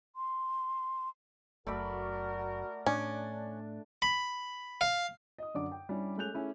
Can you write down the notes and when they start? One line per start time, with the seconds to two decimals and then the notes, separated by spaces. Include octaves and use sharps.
0.16 C6
1.67 F#1 F#2 A3 F#4 A#4 D5 B5
2.86 A2 C#4 D4
4.02 B5
4.81 F5
5.38 D#5 D#6
5.55 F#2 D3 D4 D5 D6
5.72 G5
5.89 G3 C#4 D4 E4
6.17 G#3 A3 C#4 F#6 G6 F7
6.34 A3 C#4 E4 G#4